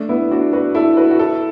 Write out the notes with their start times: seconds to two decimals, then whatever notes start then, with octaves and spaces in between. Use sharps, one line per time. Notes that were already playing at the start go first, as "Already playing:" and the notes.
Already playing: A3 D4
0.09 B3 E4
0.31 D4 F#4
0.53 F#4 B4
0.75 E4 A4
0.97 F#4 B4
1.11 F#4
1.19 E4 A4